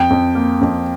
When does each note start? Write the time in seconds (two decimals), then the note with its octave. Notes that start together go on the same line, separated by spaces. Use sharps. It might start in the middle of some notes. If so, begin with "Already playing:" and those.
Already playing: F2 G5
0.10 F2
0.35 A#3
0.61 F2